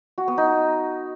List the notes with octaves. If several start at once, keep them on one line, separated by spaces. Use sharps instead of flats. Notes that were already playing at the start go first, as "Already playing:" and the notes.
F#4
B3
D#4